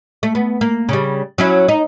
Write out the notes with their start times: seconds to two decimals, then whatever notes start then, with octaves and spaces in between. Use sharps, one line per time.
0.23 A3
0.35 B3
0.61 A#3
0.89 C#3 G3
1.38 F#3 C#4 E4
1.68 D#4